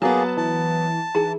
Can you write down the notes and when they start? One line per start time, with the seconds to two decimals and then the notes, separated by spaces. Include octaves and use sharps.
0.02 F#3 A#3 B3 G#4 A5
0.37 E3 A5
1.15 E3 D#4 G#4 A#5